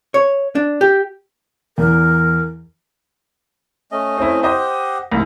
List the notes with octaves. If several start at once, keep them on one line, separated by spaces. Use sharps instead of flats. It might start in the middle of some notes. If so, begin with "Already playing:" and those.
C#5
D4
G4
E2 A#4
A3 C#4 D#5
C4 E4
G4 C5 D#5 F#5
C2 G#2